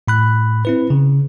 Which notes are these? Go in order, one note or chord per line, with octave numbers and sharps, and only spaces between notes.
A2 B5 F#6
C4 E4 B4
C#3